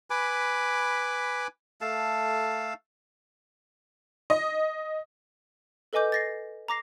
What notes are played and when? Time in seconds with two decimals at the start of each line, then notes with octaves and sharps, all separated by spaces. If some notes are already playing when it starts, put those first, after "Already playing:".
0.10 B4 G#5 B5 D6
1.81 A3 A4 F5 A5
4.30 D#5
5.93 A4 B4 D#5 G#5 D6 G6
6.12 A6 A#6 C7
6.68 A#5 D6 A#6 C7